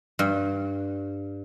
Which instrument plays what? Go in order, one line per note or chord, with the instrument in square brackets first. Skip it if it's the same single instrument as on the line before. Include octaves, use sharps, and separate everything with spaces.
[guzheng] G2